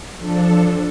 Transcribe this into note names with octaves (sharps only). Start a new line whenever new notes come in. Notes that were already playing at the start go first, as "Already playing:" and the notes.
F3 D4 A4